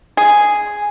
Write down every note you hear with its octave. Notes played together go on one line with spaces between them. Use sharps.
G#4